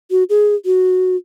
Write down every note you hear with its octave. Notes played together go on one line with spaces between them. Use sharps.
F#4
G#4
F#4